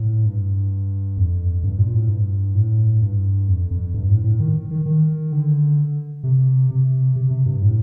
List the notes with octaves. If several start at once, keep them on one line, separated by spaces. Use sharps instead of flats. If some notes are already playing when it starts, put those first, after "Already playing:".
Already playing: A2
G2
F2
G2
A#2
A2
G2
A2
G2
F2
F2
G2
A2
A2
D#3
D#3
D#3
D3
C3
C3
C3
C3
G2
A2